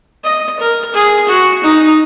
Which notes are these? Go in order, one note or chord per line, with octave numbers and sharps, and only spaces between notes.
D#5
A#4
G#4
F#4
D#4